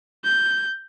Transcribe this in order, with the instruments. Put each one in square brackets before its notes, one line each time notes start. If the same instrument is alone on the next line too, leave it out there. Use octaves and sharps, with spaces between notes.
[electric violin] G6